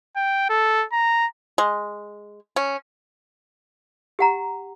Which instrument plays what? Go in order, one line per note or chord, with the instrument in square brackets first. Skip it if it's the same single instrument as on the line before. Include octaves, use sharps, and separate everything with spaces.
[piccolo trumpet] G5
A4
A#5
[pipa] G#3
C#4
[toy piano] G4 F#5 A#5